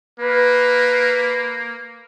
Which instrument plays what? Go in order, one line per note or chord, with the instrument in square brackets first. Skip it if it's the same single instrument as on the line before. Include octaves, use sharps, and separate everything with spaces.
[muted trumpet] A#3 [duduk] B4